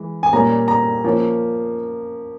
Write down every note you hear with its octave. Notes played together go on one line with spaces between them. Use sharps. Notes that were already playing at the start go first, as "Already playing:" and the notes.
Already playing: E3 G#3
G#5
A#2 G3 A#3 C#4 A#5
A#5
F3 A#3 C#4